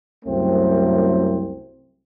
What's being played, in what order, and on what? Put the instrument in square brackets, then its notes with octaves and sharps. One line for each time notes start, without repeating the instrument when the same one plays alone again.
[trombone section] C2 F#2 A3 C4